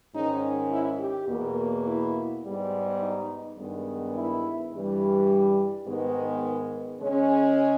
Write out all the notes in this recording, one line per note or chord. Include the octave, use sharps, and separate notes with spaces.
G#2 D#3 G#3 C#4 D#4
E4
G4
E2 B2 A#3
E4
G#2 G3 B3
D#4
G2 D#3 G#3 B3
E4
G2 E3 G3
G#2 D#3 G#3 B3
C#3 G#3 C#4